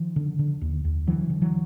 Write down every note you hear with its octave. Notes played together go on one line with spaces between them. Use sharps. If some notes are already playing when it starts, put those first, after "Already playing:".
Already playing: D#3 F3
D3
D3
D#2
D#2
D3 E3 F#3
D3
E3 F#3